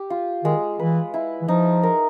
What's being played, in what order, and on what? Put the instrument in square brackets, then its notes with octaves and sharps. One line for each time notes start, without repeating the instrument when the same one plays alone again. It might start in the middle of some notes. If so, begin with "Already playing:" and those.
Already playing: [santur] G4
F4
[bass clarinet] D#3 [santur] G#3
[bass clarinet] E3 [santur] B4
[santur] E4
[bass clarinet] E3
[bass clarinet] F3 [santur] D#4
[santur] A#4